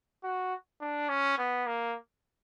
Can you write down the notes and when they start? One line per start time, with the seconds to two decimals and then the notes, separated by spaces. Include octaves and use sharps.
0.24 F#4
0.81 D4
1.09 C#4
1.38 B3
1.66 A#3